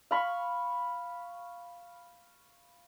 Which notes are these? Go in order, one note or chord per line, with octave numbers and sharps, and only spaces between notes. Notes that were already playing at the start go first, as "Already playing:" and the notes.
F5 B5 C#6